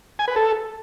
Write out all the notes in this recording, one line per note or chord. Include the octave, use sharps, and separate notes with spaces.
G#5
B4
A4